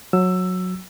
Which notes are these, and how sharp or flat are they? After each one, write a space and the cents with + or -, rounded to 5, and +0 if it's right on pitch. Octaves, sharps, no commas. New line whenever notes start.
F#3 -15 E6 +10